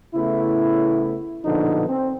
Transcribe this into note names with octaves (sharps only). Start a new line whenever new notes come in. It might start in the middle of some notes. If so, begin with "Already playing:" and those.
C#3 A3 B3 E4
A#1 B2 D3 F3 B3 D#4
C4